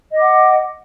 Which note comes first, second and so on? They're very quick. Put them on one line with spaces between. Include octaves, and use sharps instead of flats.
D#5 D6 F#5